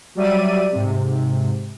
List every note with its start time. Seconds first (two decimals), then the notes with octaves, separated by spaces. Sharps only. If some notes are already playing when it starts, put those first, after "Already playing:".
0.15 F#3 G3 D5 E5 D#7
0.71 G#2 C3